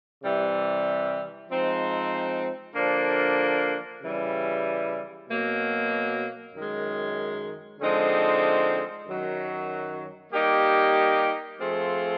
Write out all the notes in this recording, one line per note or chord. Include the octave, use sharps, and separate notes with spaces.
C3 E3 G3
F3 G#3 C4 D#4
D3 F3 A#3 D4
C#3 E3 G3
B2 F#3 A#3
F#2 D#3 G#3
D3 F3 G#3 C4 D#4
F#2 D#3 F#3
G3 A#3 D#4 G4
F3 A3 C4 F4 G#4